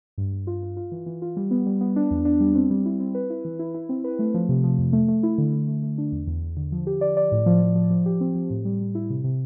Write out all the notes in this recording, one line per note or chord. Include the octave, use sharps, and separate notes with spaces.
G2
G2
F4
F4
F4
E3
E3
F4
G3
B3
G3
B3
D4
E2
D4
G3
C4
G3
E4
C4
B4
E4
E3
E4
E4
C4
B4
A3
F3
C3
F3
F2
A3
A3
E4
D3
A3
A3
A3
D4
E2
E2
E2
D3
F3
G4
D5
D5
A2
F3
F3
F3
F3
G4
C4
F3
A2
G3
G3
E4
C3
C3